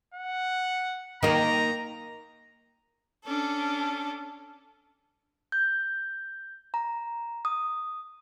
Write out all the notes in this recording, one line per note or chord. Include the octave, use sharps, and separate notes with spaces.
F#5
D#3 A#3 A#5
C#4 D4 A4
G6
A#5
D#6